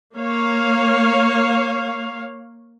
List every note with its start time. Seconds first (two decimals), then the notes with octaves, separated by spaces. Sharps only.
0.15 A#3 C#5 F5